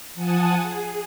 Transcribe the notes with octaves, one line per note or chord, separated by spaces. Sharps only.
F3 F#5 G#5 A5 D#6
G#4